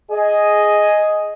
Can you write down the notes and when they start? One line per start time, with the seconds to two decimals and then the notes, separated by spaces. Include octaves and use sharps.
0.12 G#4 D#5